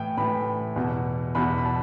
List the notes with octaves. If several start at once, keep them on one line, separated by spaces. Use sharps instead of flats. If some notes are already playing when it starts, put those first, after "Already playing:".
Already playing: A2 E3 G5
A2 E3 B5
E2 B2
E2 B2 B5
B5
A5